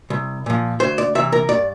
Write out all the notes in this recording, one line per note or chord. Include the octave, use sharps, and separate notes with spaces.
C2
A#2 F3
D2 C5
D5
C3 E3 E5
A#4
G2 D5